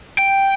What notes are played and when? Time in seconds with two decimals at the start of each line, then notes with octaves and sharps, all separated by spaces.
0.19 G5